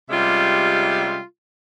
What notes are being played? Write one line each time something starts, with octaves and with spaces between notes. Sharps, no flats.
C3 G3 G#3 C#4 F4 E5